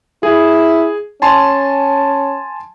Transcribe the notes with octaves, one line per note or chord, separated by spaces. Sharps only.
E4 G#4
C#4 G#5 A5 C6